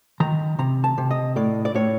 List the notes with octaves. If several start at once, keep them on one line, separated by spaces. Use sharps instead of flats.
D#3 A#5
C3 A#5
A5
C3
D#5
A2 D5
D5
A2 C#5